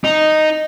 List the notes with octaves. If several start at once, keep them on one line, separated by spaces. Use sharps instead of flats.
D#4